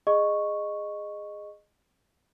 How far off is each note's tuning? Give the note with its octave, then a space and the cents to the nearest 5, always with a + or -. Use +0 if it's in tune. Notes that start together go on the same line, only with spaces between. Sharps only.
G#4 +0 D#5 -15 C#6 +0